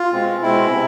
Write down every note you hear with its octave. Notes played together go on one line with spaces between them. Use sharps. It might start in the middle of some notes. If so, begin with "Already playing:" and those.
Already playing: F4
B2 G#3 C4
B2 G#3 C4 E4
C3